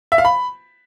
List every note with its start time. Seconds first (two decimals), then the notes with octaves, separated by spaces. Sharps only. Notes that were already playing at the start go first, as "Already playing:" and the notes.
0.12 E5
0.18 F5
0.25 B5